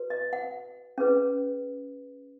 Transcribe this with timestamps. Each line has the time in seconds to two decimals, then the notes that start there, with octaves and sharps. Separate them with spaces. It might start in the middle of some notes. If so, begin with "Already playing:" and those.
Already playing: F#4 B4
0.10 D#5
0.33 F#5
0.98 C#4 G#4 B4